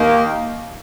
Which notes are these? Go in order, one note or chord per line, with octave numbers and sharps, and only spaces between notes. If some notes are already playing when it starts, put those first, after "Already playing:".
Already playing: D#2 D#3 A#3 G4